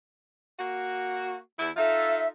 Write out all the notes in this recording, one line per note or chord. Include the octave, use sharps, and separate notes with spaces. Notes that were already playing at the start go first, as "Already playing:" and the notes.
A#3 F#4
E2 E4
D#4 F4 A4 E5